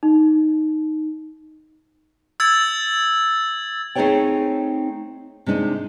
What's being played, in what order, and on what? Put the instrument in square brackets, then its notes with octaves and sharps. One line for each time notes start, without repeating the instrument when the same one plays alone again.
[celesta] D#4
[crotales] E6 G#6 A6
[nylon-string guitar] A3 C4 D#4 G#4 C#5 G5
C3 G#3 D4 D#4